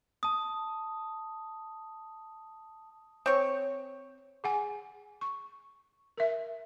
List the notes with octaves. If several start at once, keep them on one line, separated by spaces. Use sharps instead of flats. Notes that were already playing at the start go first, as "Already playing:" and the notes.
A5 D#6
C4 C#5
G#4 F#5 G#5
C#6
A#4 E5